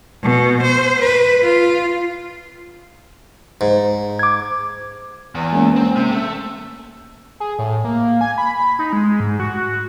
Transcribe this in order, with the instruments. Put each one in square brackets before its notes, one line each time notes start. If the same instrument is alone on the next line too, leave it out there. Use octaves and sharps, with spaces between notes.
[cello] B2
C5
B4
F4
[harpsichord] G#2
[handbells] D6 G#6
[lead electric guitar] E2
[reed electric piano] G#3 A#3 C#4
[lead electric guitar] C4
C3
A3
[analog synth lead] G#4
A2
A#3
G#5
B5
D#4
G#3
G#2
F#4